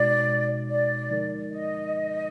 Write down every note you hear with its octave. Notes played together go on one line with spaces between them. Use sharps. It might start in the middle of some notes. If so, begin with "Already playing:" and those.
Already playing: B2 G#3 D#4 F#4 D5
D5
D3 F3 G#3 D#4 A#4
D#5